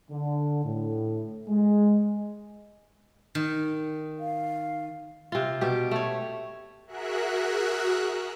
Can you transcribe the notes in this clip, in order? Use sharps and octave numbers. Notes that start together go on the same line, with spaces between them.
D3
A2
G#3
D#3
F5
C3 F4
B2 G4
A3 C#5
F#4 G#4 A#4 E5 F#6